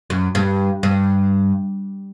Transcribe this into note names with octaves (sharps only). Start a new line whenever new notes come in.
F#2
G2
G2